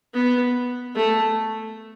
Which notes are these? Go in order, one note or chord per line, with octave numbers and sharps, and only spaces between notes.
B3
A3